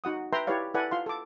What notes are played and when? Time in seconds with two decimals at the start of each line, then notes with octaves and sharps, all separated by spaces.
0.04 D#4 F#4 F#5 D#6
0.33 B4 E5 G5 A#5 C6
0.47 E4 G4 B4 C#5 D5 F5
0.74 E4 A4 B4 D5 F#5 G#5
0.91 F4 F5 C6
1.06 A4 D6